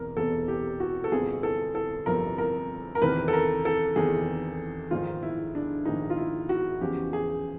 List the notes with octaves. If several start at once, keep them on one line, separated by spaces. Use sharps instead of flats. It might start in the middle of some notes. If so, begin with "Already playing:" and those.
Already playing: E1 E2 C3 A#4
E1 E2 C3 A4
G4
F#4
A4
G1 F2 C3 F3 G#4
A4
A4
G1 F2 C3 F3 A#4
A#4
A#4
E2 C3 D#3 B4
A4
A#4
A4
E2 C3 D#3 G#4
A#1 G#2 D#3 F4
E4
D4
A#1 G#2 D#3 D#4
F4
E4
F#4
E2 C#3 F3 G4
G#4